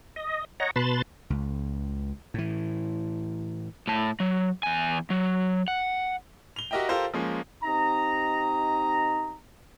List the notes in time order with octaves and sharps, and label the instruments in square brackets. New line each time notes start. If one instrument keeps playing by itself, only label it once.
[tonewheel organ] D#5
C#5 D#5 F#5 A#5
B2 B4 A5 B5 C6 A6
[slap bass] C#2
A2 E3
[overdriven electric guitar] A2 A5
F#3
E2 G#5
F#3
F#5
[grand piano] F7 G7
F#4 G4 A#4 D#5 E5 G5
F4 G4 A4 A#4 C5 F5
F3 G#3 A#3 C#4
[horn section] C4 D#4 G4 D#5 A#5